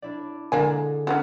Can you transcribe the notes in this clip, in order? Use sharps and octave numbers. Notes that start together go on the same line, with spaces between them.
D4 E4 D5
D3 G#3 A#3 D4 G#5
C#4 D4 F4 F#4